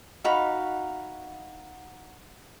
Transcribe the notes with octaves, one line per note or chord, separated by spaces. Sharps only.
D#4 F#4 F5 B5